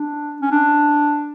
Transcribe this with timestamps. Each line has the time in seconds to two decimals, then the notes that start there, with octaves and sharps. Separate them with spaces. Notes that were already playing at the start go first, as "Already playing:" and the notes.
Already playing: D4
0.42 C#4
0.51 D4